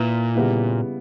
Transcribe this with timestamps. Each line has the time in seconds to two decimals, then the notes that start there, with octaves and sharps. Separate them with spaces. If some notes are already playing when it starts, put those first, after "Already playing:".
Already playing: A#2 A#3 E4 B4
0.35 C#3 G3 B3 E4